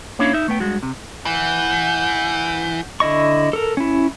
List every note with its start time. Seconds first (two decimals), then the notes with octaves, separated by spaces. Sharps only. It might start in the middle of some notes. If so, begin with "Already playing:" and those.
0.19 A#3 C#4 D4 E4 C#5 F5
0.33 D#4 E5
0.48 A3 B3 G5
0.60 G2 G#3 F#4
0.83 C3
1.26 E3 F#5 G6
3.00 D3 E4 D#5 C#6
3.53 A4 A#4
3.77 C#4 E4